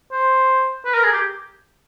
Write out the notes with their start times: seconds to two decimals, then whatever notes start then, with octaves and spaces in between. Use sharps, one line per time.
0.12 C5
0.85 B4
0.94 A#4
1.04 G#4
1.13 G4